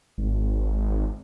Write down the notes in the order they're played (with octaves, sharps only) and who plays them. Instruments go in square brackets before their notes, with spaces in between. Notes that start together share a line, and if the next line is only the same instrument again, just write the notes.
[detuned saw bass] G#1